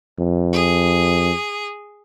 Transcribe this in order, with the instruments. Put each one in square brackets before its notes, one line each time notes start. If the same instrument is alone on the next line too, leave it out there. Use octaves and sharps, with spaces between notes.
[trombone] F2
[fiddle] G#4